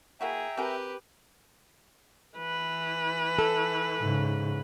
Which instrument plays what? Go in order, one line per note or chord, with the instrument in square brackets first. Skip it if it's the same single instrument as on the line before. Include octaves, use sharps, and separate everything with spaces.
[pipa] A#3 E4 F#4 [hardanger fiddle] G#4 [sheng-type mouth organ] E5 G5 A#5
[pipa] C4 G#4 A#4 [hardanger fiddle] G4 B4
[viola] E3 B4
[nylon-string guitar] A4
[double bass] G#2 C#3